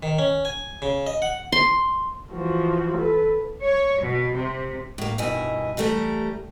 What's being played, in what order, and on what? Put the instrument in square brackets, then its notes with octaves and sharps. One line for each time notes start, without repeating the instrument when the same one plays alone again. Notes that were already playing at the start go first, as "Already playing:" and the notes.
[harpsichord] D#3
C#4
G#5
C#3
D#5
F#5
[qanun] C6
[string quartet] E3 F3 F#4
A4 B4
[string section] C#5
B2
C3
[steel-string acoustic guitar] A2 A#3
G2 B2 D#3 E4 D#5 G#5
E3 G3 A3 G4 A#4